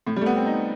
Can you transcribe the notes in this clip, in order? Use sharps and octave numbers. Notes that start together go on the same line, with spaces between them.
A2
G3
A3
B3
C4
D#4